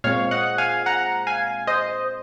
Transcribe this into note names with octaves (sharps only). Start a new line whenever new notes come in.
A#2 G#3 C4 C#5 F5
D#5 F#5
F5 G#5
F#5 A#5
F5 G#5
C5 D#5